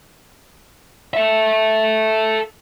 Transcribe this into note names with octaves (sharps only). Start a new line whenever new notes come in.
A4 E5